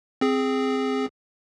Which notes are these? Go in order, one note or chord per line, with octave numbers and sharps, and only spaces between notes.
C4 G#4